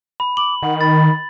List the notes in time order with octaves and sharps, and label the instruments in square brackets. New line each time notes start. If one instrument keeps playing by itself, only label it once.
[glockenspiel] B5
[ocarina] D6 [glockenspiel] F#7
[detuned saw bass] D#3 [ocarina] F#5
[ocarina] B5 [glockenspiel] A6